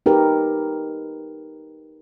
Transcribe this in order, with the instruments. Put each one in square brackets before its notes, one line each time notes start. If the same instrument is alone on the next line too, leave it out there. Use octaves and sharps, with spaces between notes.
[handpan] D#4 G4 A#4 B4